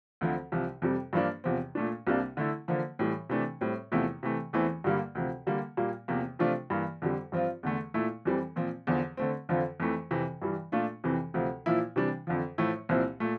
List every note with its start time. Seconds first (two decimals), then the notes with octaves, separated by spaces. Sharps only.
0.21 D2 D3 F3 C4
0.52 C2 C3 F3
0.82 F2 C3 G3
1.13 G2 F3 A#3 D4
1.44 E2 C3 F3 C4
1.75 A#2 A3 D4
2.07 C2 C3 G3 A#3 D4
2.37 D3 A3 E4
2.68 D3 F3 A#3
2.99 A2 E3 G3
3.30 C3 E3 A3 D4
3.61 A2 G3 C4
3.92 E2 C3 F3 A3 E4
4.23 C3 E3 A3
4.53 E2 E3 A3 C4 E4
4.84 G2 D3 G3 A#3
5.15 D2 C3 F3
5.47 D3 G3 A#3
5.77 A#2 G3 A#3
6.08 E2 C3 F3 A#3
6.39 C3 F3 A3 D4 F4
6.70 G2 E3 A#3
7.02 F2 D3 G3
7.32 G2 F3 C4 F4
7.63 E2 D3 A3
7.94 A#2 A3 E4
8.25 F2 E3 G3 C4
8.56 A#2 F3 C4
8.87 E2 D3 F3
9.17 D3 A3 C4
9.49 F2 D3 F3 C4 F4
9.80 F2 E3 A3
10.11 F2 C3 E3
10.42 G2 E3 G3
10.72 A#2 A3 D4 F4
11.04 F2 C3 E3
11.34 D2 C3 F3
11.66 A#2 F3 A#3 E4
11.96 C3 E3 G3 D4
12.27 F2 D3 F3
12.58 A2 F3 A3 E4
12.89 C2 A#2 F3 C4 E4
13.20 A#2 A3